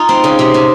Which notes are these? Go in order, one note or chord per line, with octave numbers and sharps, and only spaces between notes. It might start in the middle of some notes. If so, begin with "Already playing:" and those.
Already playing: D#4 F4
C4
C#3
C3
C3